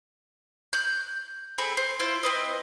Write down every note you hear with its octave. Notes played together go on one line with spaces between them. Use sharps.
F#6 G6
C4 G#4 A4 B5
C5
E4 F4 C5
C4 B4 D#5